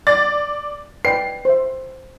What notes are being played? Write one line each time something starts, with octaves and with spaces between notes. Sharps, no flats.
D5 A6
B4 D5 G5 C7
C5 E5